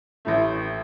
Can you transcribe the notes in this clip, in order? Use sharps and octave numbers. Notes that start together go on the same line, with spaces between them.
A1 A2 A3